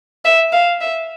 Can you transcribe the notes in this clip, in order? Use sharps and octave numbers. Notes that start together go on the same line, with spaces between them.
E5
F5
E5